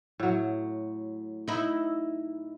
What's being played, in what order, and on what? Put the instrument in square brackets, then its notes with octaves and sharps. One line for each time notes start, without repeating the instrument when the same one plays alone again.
[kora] A2 F#3
[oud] D#4 E4 [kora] D#5